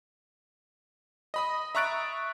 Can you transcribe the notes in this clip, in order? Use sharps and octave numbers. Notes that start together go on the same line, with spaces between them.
D#5 B5 D#6
E5 A#5 C#6 F#6 A6 D7